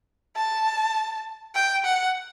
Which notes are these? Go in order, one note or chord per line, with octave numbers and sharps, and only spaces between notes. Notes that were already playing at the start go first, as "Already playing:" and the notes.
A5
G5
F#5